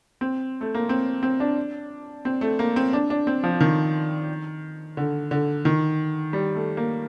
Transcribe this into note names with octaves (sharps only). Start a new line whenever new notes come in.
C4
A3
A#3
C4
C4
D4
C4
A3
A#3
C4
D4
D4
C4
F3
D#3
D3
D3
D#3
G3
A3
A#3